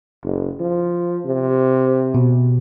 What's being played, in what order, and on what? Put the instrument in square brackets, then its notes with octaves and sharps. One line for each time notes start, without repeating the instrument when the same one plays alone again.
[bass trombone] F#1
F3
C3
[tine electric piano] B2